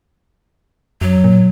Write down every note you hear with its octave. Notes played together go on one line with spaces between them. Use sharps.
F#2 F#3
A#2